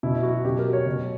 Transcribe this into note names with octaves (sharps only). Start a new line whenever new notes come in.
B2 E4
F#3 F#4
B2 G4
A#4
F#3
C#5
B2